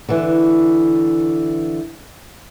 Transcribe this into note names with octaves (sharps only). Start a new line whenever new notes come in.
D3 E3